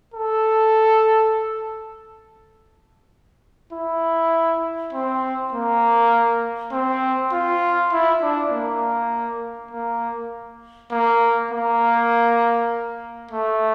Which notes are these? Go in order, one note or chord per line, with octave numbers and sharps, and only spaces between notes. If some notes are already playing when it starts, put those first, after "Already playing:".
A4
E4
C4
A#3
C4
F4
E4
D4
A#3
A#3
A#3
A#3
A3